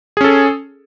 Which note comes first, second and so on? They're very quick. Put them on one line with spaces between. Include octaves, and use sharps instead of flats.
G#4 C#4 A4